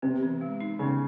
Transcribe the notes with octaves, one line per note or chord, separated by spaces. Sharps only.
C3 B3
E3
G#3
D#4
C#3 B3